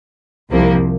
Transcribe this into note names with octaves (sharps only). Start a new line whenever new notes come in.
C2 C3 F3 A#3